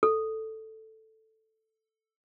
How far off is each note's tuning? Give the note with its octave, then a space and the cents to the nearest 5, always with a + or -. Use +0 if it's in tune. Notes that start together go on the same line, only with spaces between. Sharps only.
A4 +0